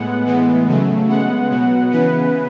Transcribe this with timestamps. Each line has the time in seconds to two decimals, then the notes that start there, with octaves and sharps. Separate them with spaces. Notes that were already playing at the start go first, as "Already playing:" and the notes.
Already playing: A2 G#3 B3 F#5
0.26 A2 E3 G#3 B3
0.67 C#3 F#3 A3
1.08 C#3 G#3 B3 F#5
1.50 B2 F#3 B3
1.91 C#3 E3 B3 B4